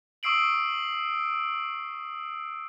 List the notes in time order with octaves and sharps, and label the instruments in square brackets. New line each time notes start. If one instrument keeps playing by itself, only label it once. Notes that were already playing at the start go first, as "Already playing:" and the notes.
[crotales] C#6 D#6 E6 C7 D7 F#7